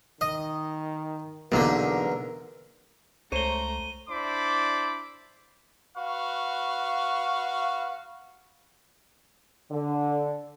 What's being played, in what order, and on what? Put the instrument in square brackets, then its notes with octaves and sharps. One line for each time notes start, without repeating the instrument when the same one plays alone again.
[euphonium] D#3 [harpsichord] D#5
[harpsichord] B1 E2 D3 [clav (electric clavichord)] B2 A#3 D#4 [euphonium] A#4
[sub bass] C#2 [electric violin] A3 A#5 [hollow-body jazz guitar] C5 C#5 [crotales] D#7 G7
[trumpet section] D4 E4 C5 D5 B5 D6
F#4 B4 F5 C#6
[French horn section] D3